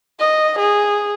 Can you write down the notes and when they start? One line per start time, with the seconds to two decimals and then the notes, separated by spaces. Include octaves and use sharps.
0.20 D#5
0.59 G#4